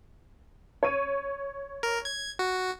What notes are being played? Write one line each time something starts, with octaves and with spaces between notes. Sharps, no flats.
C#5 D#7
A#4
G#6
F#4